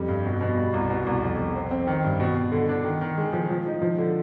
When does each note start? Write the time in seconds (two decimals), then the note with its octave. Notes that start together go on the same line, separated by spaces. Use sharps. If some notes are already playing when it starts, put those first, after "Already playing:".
Already playing: F2 G3
0.08 G2
0.25 B2
0.41 B2
0.57 G3
0.74 C2
0.90 B2
1.06 C2
1.23 F2
1.38 F2
1.55 C4
1.71 C4
1.87 D#3
2.04 G2
2.20 B2
2.36 B2
2.52 D3
2.69 D4
2.84 D#3
3.01 D#3
3.17 G#3
3.33 F3
3.50 F3
3.66 D#4
3.82 F3
3.98 D3